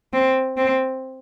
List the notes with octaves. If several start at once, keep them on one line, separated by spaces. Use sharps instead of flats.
C4
C4